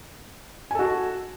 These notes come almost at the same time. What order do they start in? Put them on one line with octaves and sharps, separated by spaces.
G#5 A4 F#4